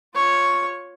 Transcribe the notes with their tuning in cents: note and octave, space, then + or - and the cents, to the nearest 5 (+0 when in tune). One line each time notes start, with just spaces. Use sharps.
F4 +15 C#5 +0